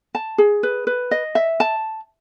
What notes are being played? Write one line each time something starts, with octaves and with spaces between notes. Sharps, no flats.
A5
G#4
B4
B4
D#5
E5
A5